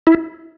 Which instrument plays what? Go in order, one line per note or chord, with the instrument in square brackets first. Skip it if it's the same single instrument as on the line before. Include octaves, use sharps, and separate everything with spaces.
[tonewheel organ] E4